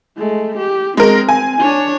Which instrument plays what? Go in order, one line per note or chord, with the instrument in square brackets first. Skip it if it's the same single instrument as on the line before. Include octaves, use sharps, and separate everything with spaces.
[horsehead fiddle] G#3 A3
G4
[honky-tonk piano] G#3 A#4 [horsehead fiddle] C4
[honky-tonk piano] G#5
[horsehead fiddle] D4 C#5